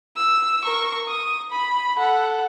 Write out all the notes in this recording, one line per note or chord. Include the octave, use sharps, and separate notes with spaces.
E6
A#4 C#6
D#6
B5
A4 F#5